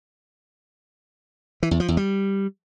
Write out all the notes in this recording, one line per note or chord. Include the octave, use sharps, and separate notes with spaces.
E3
E2
F3
E2
G3